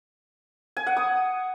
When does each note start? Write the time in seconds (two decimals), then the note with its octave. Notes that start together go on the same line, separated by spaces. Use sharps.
0.77 G#5
0.87 F#5
0.97 D#6